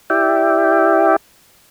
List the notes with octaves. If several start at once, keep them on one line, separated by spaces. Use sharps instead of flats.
E4 G4 D5 E5 G5